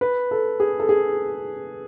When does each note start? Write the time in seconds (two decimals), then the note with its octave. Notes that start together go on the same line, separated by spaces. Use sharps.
0.01 B4
0.31 A4
0.60 G#4
0.80 A4
0.89 G#4